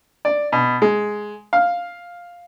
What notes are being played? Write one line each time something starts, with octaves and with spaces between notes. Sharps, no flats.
D5
B2
G#3
F5